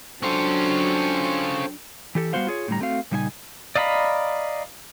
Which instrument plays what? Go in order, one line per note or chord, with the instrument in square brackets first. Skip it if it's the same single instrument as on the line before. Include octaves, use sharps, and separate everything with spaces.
[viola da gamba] F#3 D4 [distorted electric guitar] C#4 F4 [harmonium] A4 C5 G5
[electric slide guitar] E3 G4 A4
G3 G#3 B3 F#4 C5 F5
F4 G#4 C#5
A2 D3 G3 A#5
A3 C4 F#4 F5
A#2 C#3 G3 D#4 C5 G#5
[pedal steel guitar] D5 D#5 F5 A#5 B5